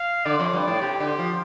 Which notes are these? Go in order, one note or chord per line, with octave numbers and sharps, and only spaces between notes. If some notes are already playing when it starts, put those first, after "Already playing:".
Already playing: F5
D3 D5
F2
G2
A2
C3 G4
D3
F3